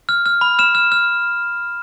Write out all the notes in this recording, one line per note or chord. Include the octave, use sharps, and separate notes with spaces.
F6
F6
B5
F6 E7
F6
F6